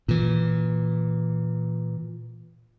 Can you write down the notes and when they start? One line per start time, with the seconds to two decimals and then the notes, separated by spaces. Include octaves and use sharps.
0.08 A#2 E3